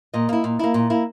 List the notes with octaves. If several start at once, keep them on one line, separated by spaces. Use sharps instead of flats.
A#2 D#5
A#3 E4
A#2
A#3 E4
A#2
A#3 E4